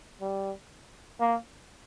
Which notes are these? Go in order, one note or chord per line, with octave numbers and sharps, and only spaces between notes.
G3
A#3